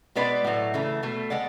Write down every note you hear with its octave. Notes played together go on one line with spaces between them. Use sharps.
B2 G#3 B3 B4 D5
A2 F#3 A3
C#3 E3 A3
B2 A3
G#3 B3 D5 F#5